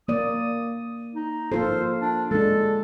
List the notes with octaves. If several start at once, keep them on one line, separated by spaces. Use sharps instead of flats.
A#3 D5 D#6
D#4
A#3 F4 A4 C5
D4
G#3 D4 A4